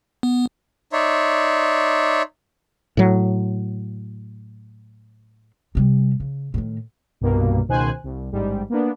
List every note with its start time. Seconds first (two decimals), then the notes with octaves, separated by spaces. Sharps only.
0.23 B3
0.93 D#4 C#5 D5 E5 C6
2.97 A2 F#3
5.75 C3 G3
6.20 C#3
6.54 A2 D#3
7.21 C2 G2 B2 A#3
7.68 C#2 B2 D#3 C5 G#5 F#6
8.04 C2
8.32 A1 G#2 G3
8.70 A#3 B3 D4